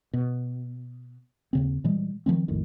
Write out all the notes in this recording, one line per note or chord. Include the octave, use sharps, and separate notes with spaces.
B2
D#2 C#3 C4
A#2 E3 G3 G#3
D#3 F3 G#3 C4
A#1 F2 A2 D#3